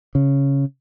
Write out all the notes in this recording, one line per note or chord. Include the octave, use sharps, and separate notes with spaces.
C#3